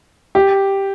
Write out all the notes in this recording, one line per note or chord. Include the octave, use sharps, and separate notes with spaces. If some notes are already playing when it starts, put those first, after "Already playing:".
G4